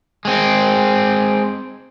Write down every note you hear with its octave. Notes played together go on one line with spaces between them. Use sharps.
G#3 C4